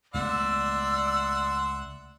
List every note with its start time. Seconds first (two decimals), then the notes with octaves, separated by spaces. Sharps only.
0.14 C#2 A3 B3 D5 E5 F#5 C6 E6